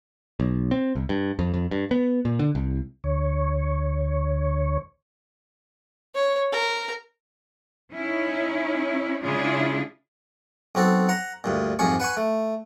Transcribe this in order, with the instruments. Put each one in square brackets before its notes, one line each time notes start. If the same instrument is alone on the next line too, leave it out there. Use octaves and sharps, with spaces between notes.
[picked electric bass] B1
C4
C2
G2
F2
F2
G2
B3
A#2
D3
C2
[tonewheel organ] D2 C#5
[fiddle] C#5
A#4
[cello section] C#4 D#4 E4
C#3 G#3 D4 E4 F4 G#4
[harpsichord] B1 C4 F#4 A4
F#5 A#5
D2 G2 A#2
C2 F2 G#2 G#4 C#6
B4 F#5 G#5 C#6
A3